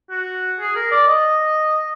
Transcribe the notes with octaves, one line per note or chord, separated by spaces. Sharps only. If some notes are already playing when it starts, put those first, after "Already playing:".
F#4
G#4
A#4
D5
D#5